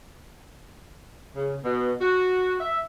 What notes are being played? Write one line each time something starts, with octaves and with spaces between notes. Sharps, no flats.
C#3
B2
F#4
E5